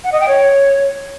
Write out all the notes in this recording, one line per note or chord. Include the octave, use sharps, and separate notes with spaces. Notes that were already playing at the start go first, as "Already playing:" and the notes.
F#5
D#5
G5
C#5